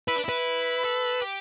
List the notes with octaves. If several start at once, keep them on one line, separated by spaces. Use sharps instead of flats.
E4 B4
D4
E4 B4
A4
G4